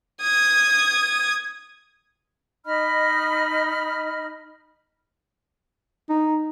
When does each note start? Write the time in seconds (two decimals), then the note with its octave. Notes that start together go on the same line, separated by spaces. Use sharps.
0.21 D#6 G#6
2.65 D#4 D#5 B5 F6
6.09 D#4